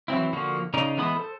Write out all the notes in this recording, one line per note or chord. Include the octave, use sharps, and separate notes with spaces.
E3 F#3 C4 E4
D3 F3 A#3 F#4
C#3 C#4 D#4 D5 A#5
E3 G#3 B3 B5 D#6
A4 C5